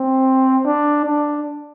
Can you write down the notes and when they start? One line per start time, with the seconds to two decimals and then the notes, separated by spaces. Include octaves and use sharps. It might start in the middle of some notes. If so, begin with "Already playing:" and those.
Already playing: C4
0.65 D4
1.05 D4